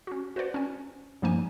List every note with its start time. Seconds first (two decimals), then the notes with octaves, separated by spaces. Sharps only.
0.07 C#4 F#4
0.36 F#4 B4 C5 D5 F#5
0.54 C#4 G#5
1.22 G2 F3 A#3 D#4 G#5